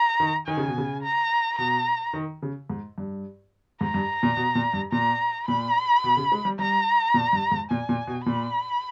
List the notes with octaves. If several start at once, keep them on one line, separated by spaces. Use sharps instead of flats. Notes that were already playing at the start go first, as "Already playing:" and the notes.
Already playing: A#5
D#3
D#3 G#5
C#3
B2
C#3
A#5
B2 A#5
D#3
C#3
G#2
G2
G#2 A#5
G2
A#2
B2
A#2
G2
A#2 A#5
A#2 B5
B2
C#3
G#3
G3
G3 A#5
A#2
G2
G#2
A#2 G#5
A#2
B2
A#2 B5